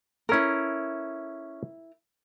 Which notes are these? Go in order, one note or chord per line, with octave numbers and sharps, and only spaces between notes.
C#4 E4 A4 A#4